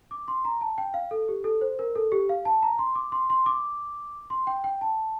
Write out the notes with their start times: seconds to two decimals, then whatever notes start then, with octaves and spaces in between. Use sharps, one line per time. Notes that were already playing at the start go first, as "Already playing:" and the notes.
0.11 D6
0.28 C6
0.45 A#5
0.61 A5
0.78 G5
0.94 F5
1.11 A4
1.28 G4
1.44 A4
1.61 C5
1.79 A#4
1.95 A4
2.12 G4
2.29 F5
2.45 A5
2.63 A#5
2.79 C6
2.95 D6
3.12 C6
3.30 C6
3.46 D6
4.30 C6
4.47 G5
4.64 G5
4.81 A5